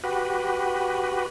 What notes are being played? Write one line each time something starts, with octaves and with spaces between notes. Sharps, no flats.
F#4 G4 B4